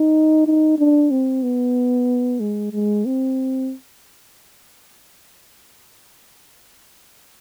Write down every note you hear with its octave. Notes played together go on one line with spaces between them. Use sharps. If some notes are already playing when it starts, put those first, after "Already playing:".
Already playing: D#4
D#4
D4
C4
B3
G#3
G#3
C4